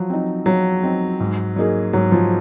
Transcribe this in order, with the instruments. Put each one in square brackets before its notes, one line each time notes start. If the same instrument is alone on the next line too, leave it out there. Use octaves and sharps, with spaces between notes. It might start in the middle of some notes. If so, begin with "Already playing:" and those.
Already playing: [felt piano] F3 [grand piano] F#3
[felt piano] C4 D#4
[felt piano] F3 [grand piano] F#3
[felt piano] C4 D#4
G#2
F#3 A#3 D#4 G#4
[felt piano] G#2 [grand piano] F#3
[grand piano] F3